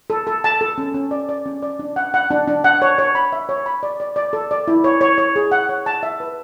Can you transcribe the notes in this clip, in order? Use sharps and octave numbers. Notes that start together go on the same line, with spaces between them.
A4
A4
A5
A4
C#4
C#4
D5
D5
C#4
D5
D4
F#5
F#5
D4
D4
F#5
C#5
C#5
B5
E5
C#5
B5
D5
D5
D5
A4
D5
E4
C#5
C#5
C#5
G#4
F#5
C#5
A5
E5
B4